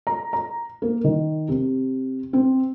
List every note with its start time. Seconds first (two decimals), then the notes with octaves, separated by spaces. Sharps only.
0.07 A#5
0.33 A#5
0.82 A#3
1.04 D#3
1.49 C3
2.33 C4